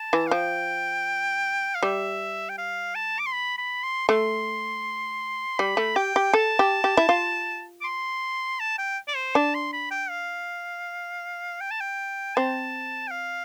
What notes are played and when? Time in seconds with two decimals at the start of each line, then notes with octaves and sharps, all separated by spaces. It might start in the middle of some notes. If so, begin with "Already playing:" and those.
Already playing: A5
0.13 E3
0.27 F5
0.31 F3 G5
1.75 F5
1.83 G3 E5
2.49 G5
2.58 F5
2.95 A5
3.19 D6
3.26 C6
3.32 B5
3.58 B5
3.83 C6
4.09 A3 C6
5.58 G3 B5
5.77 A3
5.96 G4 G5
6.16 G4
6.33 A4 A5
6.59 G4
6.84 G4
6.97 E4
7.09 F4
7.81 D6
7.84 C6
8.60 A5
8.78 G5
9.08 D5
9.16 C5
9.35 D4 A5
9.55 C6
9.73 B5
9.91 G5
10.10 F5
11.61 G5
11.71 A5
11.80 G5
12.36 C4 A5
13.07 G5
13.11 F5